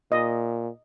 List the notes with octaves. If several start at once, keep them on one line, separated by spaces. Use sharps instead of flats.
A#2 D#5